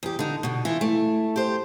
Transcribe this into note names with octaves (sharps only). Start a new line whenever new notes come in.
E2 G4
D3 D#4
B2 D3
E3 E4 F4
A3
G4 C5